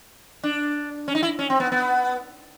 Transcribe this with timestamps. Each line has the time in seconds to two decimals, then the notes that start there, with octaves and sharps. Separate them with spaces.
0.44 D4
1.08 C#4
1.15 D#4
1.23 E4
1.39 C#4
1.50 C4
1.60 B3
1.72 B3